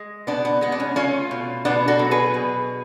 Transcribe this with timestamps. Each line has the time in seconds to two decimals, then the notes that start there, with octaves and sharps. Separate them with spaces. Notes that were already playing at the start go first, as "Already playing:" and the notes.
Already playing: G#3
0.27 B2 B3 D4
0.45 B3
0.61 G#3 B3
0.72 D4
0.80 C#4
0.96 A3 C#4 F4
1.31 B2
1.65 B2 B3 D4
1.88 F#4 A4
1.99 F#3
2.11 G#4 B4
2.34 B2